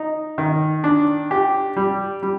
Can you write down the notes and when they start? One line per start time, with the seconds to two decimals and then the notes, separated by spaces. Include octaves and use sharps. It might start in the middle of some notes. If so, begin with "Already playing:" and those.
Already playing: D#4
0.38 D#3
0.84 D4
1.31 G4
1.76 G3
2.23 G3